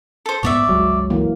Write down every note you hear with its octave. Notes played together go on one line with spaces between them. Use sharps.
A4 C5
A#1 G#2 B3 C#5 D5 E5
G1 C#2 F#3 G#3
E3 A#3